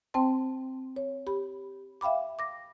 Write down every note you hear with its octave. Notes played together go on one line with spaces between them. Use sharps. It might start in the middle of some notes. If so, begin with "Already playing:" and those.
C4 C5 G5 A5 C6
C#5
G4 B5
E5 F5 G5 B5 D6
D6 A#6